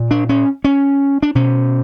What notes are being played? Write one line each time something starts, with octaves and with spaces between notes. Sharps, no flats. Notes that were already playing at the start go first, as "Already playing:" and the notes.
Already playing: A#2
D4
C#4
C#4
D4
B2 C#4